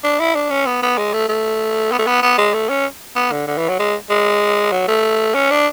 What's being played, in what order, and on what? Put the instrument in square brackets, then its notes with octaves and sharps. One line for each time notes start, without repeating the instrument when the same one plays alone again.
[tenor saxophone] D4
E4
D4
C#4
B3
B3
G#3
A3
A3
B3
A3
B3
B3
G#3
A3
C#4
B3
D3
D3
E3
F#3
G#3
G#3
F#3
A3
C#4
D4